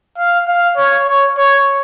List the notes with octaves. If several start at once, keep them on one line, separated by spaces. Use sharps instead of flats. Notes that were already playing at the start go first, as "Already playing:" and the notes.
F5
F5
C#5
C#5
C#5